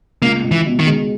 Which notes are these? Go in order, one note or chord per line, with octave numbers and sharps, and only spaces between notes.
C#2 A#3
C#2
E3
B2
D#3
G#3